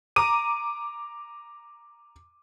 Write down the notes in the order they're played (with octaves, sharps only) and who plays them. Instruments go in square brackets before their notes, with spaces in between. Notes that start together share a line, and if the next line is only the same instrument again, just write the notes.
[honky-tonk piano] A#5 D6 D#7